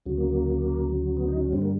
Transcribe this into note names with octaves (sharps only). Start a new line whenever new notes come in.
D2 C#3 F#3
A#3
A#3
B3
D#4
C#4
G2 D3 G3 C4
A#3